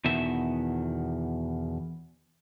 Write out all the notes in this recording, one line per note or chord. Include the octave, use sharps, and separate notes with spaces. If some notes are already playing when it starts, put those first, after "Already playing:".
E2 B2 D#3 E5